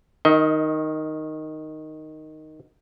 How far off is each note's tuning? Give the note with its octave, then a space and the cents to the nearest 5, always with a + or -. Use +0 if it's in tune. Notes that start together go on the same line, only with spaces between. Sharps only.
D#3 +0 D#5 +30